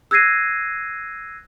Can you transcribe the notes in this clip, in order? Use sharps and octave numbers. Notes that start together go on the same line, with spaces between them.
E6 F#6 G#6 A#6 C7 D#7